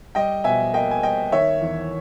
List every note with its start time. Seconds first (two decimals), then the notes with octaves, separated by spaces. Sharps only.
0.15 G3 D#5 G5
0.44 B2 E5 G#5
0.74 A#3 D#5 G5
0.91 G#5
1.03 G3 D#5 G5
1.32 D#3 C#5 E5
1.61 E2